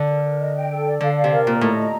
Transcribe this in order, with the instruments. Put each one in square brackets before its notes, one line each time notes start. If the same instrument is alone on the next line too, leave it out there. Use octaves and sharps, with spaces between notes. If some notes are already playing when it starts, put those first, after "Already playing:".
Already playing: [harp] D3
[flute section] A#4
A#4
D#5
G5
A4
D5
[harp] D3 [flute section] F5
[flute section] D5
[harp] C3
[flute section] A#4
[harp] A#2 [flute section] A#5
[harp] A2 [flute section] D#5
[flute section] A#5